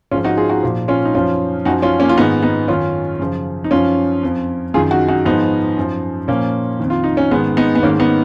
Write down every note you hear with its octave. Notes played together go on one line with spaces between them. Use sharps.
G#2 F3 C#4 F4
D#4 F#4
F4 G#4
D#4 F#4
A#2 F3
C#4 F4
D#4
F#2 F3 C#4 F4
F#2 F3 D#4 F#4
C#4 F4
A#3 C#4
F4
G#2 D#3 B3 D#4
B3 D#4
F#2 D#3 C#4 F4
F#2 C#3 F3
D#4
F#2 F3 C#4 F4
F2 F3
F#2 D#3 F4 G#4
D#4 F#4
D#4 F#4
G#2 F3 B3 D#4
F#2 F3
A#2 F3 A#3 C#4
F2 D#3
F4
D#4
C#4
G#2 D#3 G#3 B3
B3 D#4
B3
G#2 D#3 A#3 C#4
B3 D#4